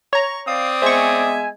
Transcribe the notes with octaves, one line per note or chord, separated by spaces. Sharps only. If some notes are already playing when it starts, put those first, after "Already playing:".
C#5 A#5 C#6
C4 D5 F5 D#6
G#3 B3 C5 E5 G#5 C#6